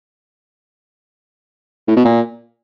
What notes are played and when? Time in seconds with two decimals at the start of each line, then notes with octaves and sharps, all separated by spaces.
1.88 A2
1.96 B2
2.05 A#2